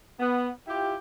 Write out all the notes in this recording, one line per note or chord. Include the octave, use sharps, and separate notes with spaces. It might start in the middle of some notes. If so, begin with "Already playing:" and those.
B3
E4 F4 G4